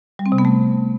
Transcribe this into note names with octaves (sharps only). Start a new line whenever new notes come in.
G3
C4
C3
B3
A3